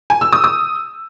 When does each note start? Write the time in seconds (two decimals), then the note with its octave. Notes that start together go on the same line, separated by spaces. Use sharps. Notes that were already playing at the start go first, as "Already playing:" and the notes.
0.10 G#5
0.21 E6
0.33 D#6
0.44 D#6